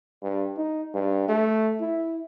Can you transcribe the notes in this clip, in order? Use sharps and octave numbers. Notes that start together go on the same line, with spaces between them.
G2
D#4
G2
A3
E4